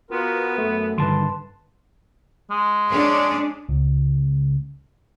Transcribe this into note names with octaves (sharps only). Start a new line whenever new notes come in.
B3 F4 F#4 A#4
F#2 A3
G2 D3 D#3 B4 A5 C6
G#3
C#4 D4 G#4
C#2